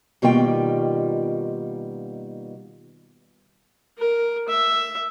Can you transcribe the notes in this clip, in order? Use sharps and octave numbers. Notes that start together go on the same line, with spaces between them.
B2 D#3 G3 A#3 F4 G5
A#4
E5